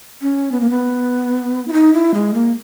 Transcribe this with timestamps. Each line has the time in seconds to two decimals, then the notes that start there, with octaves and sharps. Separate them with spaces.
0.22 C#4
0.52 B3
0.61 A#3
0.70 B3
1.68 E4
1.73 D#4
1.93 E4
2.14 G#3
2.34 A#3